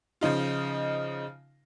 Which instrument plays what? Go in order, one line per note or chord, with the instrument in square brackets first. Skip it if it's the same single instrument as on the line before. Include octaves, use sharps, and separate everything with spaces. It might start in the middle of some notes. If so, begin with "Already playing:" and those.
[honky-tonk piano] C#3 F3 D#4 F4